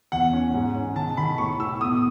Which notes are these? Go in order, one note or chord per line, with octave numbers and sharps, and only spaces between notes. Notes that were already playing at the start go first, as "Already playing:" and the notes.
E2 F#5
C#4
G#2
C#4
D#3 A5
D#3 B5
A2 C#6
A2 E6
B2 D#6